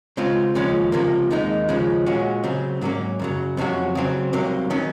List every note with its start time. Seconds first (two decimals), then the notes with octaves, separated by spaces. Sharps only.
0.17 C#3 G#3 C4 F4
0.55 D#2 C#3 F3 G#3 C#4
0.92 C#2 C3 F3 A#3
1.30 D#2 D#3 G#3 D#4
1.69 D#2 C#3 F3 G#3 C#4
2.06 A#2 G#3 C#4 F#4
2.44 C#3 F#3 C4
2.81 G#2 F#3 A#3 C#4
3.19 F#2 C#3 F#3
3.57 F2 C3 F#3 C#4 F#4
3.95 C#3 F#3 C4
4.33 C2 C3 F#3 A#3
4.70 D#3 F#3 C#4